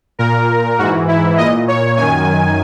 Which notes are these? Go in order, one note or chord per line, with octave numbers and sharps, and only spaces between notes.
A#2 A#4
G#2 E3 F#4
E4
A#2 D#5
C#5
F#2 D#3 G#5